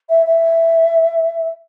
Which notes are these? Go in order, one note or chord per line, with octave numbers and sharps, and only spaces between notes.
E5
E5